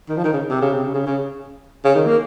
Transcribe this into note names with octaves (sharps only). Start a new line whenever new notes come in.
D#3
F3
D#3
C#3
C3
C#3
C3
C#3
C#3
C#3
C#3
D#3
A#3